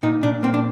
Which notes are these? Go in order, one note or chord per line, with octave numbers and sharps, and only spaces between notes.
A#2 D#4
A#2 D4
A#3 C4
D4